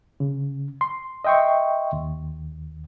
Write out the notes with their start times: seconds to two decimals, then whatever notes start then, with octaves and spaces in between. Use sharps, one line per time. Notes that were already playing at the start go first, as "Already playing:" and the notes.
0.20 C#3
0.81 C6
1.25 D#5 E5 G5 C6 C#6
1.93 D#2